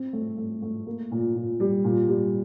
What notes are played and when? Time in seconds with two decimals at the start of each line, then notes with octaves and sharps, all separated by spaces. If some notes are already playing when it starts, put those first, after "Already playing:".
Already playing: C4
0.13 A3
0.38 A3
0.62 A3
0.87 A#3
1.11 A#2
1.35 A#2
1.60 G3
1.84 A#2
2.08 G3